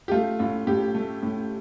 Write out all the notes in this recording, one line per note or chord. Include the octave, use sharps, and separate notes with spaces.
G4
A3 F4
A2 F4
A2 G4
A3
A2